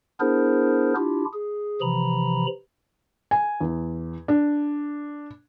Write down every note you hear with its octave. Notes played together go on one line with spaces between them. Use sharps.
B3 D4 E4 G#4 A#4 C5
D4 E4 F4 G4
G#4
C3 E3 F3 A#5 B5
G#5
E2
D4